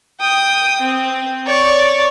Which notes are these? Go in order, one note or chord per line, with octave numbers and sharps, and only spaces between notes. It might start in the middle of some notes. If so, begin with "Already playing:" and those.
G5 D#6
C4
C#5 D5